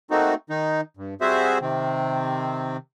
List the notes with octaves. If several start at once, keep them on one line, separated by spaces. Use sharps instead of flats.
A3 A#3 C4 D#4 F#4
D#3 D#4
G2
G3 C4 F#4 G#4 C5 E5
C3 D#3 C4